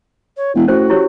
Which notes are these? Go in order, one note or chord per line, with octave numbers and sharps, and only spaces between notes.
C#5
E1 E4
A2 C#4 F#4 C5 G5
E4 G4 C#5